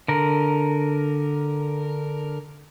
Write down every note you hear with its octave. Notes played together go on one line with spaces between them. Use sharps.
D3 A#4